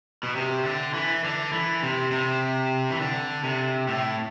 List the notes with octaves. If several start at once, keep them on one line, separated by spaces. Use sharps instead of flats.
B2
C3
D3
E3
D3
E3
C3
C3
E3
D3
C3
A2